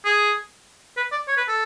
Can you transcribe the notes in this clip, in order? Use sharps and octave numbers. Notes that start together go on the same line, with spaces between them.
G#4
B4
D5
C#5
B4
A4